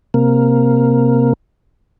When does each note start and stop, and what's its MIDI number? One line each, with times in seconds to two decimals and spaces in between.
0.14 1.33 48
0.14 1.33 58